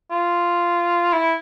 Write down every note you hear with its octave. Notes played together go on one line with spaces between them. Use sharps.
F4
E4